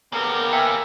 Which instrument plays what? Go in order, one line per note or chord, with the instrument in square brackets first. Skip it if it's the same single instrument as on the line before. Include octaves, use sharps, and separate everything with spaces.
[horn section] G2 C#3 B3 [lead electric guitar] A#3 G4 [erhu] A#4
[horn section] B4 E5 G#5 [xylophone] G5